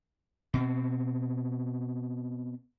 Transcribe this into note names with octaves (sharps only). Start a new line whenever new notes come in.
B2 C4